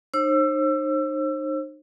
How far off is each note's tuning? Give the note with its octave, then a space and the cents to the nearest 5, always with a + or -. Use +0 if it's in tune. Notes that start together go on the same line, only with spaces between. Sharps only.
D#4 -35 C5 +40 E6 +25